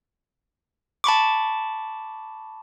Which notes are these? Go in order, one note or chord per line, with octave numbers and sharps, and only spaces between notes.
A5 B5 C#6 D6